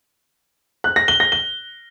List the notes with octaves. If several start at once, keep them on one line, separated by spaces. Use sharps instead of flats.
F#6
A#6
G7
A#6
G7